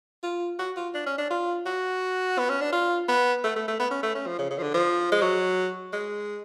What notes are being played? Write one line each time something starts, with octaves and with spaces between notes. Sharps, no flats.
F4
F#4
F4
D4
C#4
D4
F4
F#4
B3
C#4
D4
F4
B3
A3
A3
A3
B3
C#4
A3
C#4
F3
C#3
C#3
F3
D3
F3
G#3
F#3
G#3